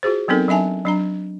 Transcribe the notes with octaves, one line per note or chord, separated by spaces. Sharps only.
F4 F#4 G#4 C5
F#3 B3 C4 D#4 A4 A#4
F#3 D4 E5 G#5 A5
F#3 D4 A#5